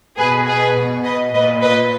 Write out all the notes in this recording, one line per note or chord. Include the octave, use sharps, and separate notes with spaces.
B2 G#4 B4
G#4 B4
B2
B4 D#5
A#2 B4 D#5
B4 D#5